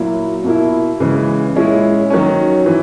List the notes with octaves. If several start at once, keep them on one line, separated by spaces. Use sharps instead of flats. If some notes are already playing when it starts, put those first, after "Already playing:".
Already playing: A#2 F#3 A#3 E4
B2 A#3 E4
C#3 E3 G#3
A#2 G#3 C#4 E4
D#3 F#3 C#4
E3